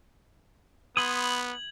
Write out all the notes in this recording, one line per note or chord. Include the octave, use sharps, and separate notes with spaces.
B3 B5 C6 D#6 G#6 F#7